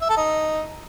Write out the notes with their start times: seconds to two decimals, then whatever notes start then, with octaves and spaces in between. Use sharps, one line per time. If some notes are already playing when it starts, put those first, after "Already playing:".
0.02 E5
0.09 A4
0.17 D#4